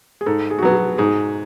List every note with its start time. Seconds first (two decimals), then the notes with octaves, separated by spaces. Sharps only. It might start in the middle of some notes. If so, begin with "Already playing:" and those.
0.21 G#4
0.26 G#2 A4
0.51 G#4
0.58 F#4
0.63 F#3 B3 G#4
0.74 F#4
0.98 G#2 G#4